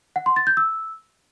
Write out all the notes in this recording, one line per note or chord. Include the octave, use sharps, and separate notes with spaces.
F#5
C6
A6
G6
E6